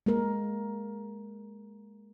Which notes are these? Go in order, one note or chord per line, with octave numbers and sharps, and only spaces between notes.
G#3 A#3 A#4